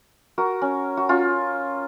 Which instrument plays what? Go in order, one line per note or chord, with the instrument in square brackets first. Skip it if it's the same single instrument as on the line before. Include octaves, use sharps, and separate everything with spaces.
[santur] F#4 A#4
C#4
F#4
C#4 F4